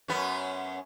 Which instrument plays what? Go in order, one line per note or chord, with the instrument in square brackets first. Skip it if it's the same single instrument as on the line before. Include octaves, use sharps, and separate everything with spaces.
[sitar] F#2 B3 C#4